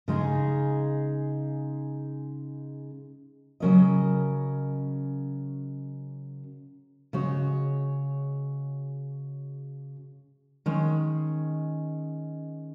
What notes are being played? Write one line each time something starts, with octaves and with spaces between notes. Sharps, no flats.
C#3 G#3 D#4 G#4
C#3 F#3 C#4 A#4 D#5
C#3 G#3 F#4 C#5
D#3 G#3 C#4